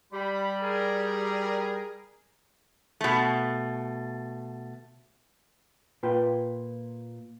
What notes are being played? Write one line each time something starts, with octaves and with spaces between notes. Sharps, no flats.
G3 B5
G#4 A#4
B2 A3
A#2 F4 B4 G5